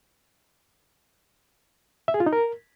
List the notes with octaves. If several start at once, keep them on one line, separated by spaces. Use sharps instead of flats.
E5
G#4
F4
D#4
A#4